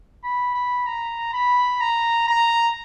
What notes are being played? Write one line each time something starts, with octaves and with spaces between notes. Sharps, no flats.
B5
B5
A#5
B5
A#5
A#5